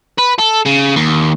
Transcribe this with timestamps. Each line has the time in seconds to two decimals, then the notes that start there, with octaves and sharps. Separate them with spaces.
0.19 B4
0.39 A4
0.66 C#3
0.96 D#2